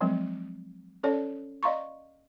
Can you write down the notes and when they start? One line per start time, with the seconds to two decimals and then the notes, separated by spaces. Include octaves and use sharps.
0.01 F3 F#3 G#3 C4
1.03 C#4 A4 C#5 D5
1.63 D5 D#5 F5 A#5 C6 C#6